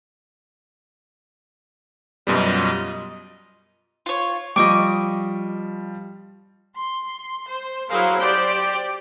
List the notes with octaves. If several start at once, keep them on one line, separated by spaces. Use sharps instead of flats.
F#2 B2 G3 F4 D#5
F4 C#5
F3 G3 D#5 C#6 D6
C6
C5
F#3 E4 G#4 A#4 C5 F5
G4 C5 D5 G5